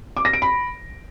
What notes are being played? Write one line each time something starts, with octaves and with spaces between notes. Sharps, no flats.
D6
A#6
D7
B5